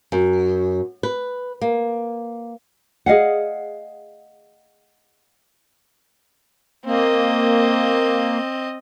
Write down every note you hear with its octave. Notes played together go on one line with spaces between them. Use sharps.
F#2
B4
A#3
G#4 D#5 F5 F#5
A#3 C4 D#5